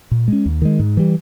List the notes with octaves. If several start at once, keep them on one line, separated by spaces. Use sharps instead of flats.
A#2
G#3 C#4
D#2
D#3 G#3
G#2
E3 G3